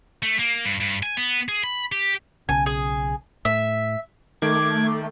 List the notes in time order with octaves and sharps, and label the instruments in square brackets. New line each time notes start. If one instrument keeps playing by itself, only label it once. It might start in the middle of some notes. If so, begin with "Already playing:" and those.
[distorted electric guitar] A3
A#3
G2
G2
G#5
B3
G#4
B5
G4
[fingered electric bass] B1 C#3 [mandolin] G#5
[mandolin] G#4
[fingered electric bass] A2 [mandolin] E5
[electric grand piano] D#3 [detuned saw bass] A3 [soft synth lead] D6 [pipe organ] G#6